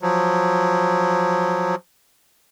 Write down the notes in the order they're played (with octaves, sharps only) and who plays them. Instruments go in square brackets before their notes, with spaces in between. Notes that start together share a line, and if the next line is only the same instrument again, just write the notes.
[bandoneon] F3 F#3